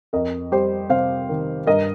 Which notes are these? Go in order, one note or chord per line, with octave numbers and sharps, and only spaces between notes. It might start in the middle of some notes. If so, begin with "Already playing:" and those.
F2 A#4 D#5
G3 G4 C5
C3 C5 F5
D#3
G2 A#4 D#5